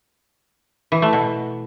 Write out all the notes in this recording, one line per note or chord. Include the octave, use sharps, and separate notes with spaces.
E3
A3
B2